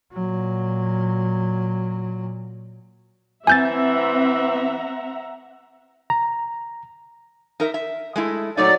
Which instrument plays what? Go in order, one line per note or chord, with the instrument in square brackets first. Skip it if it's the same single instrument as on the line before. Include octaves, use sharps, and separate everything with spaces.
[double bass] A#2 F#3
[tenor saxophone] E3 [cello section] C4 [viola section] E5 F#5 A#5 [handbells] G#5 G6 A6
[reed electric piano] A#5
[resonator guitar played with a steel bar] D#4 A#4 E5
E5
G#3 A3 E4
[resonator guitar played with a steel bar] A#2 A3 D#4 [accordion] F#3 D5